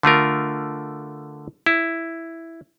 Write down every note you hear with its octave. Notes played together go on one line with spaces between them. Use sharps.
D3 A3 F4 A#4
E4